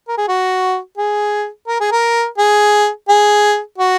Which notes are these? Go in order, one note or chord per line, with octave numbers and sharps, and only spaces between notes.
A#4
G#4
F#4
G#4
A#4
G#4
A#4
G#4
G#4
F#4